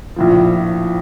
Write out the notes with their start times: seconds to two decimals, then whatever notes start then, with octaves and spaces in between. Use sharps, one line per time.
0.16 A#1 A2 F3